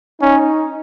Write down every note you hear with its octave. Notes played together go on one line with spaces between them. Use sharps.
C#4 D#4